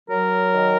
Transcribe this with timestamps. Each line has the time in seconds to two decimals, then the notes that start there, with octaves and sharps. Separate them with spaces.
0.09 F#3 A#4
0.55 D#3